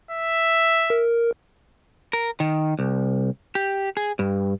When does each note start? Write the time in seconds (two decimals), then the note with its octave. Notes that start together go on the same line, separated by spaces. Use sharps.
0.11 E5
0.90 A#4
2.13 A#4
2.40 D#3
2.79 C2
3.55 G4
3.97 G#4
4.19 G2